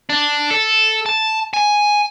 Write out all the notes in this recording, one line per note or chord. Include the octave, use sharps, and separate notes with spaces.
D4
A4
A5
G#5